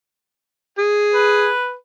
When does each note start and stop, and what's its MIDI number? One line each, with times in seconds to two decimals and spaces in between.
0.78 1.50 68
1.14 1.74 71